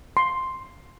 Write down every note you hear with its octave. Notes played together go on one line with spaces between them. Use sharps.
C6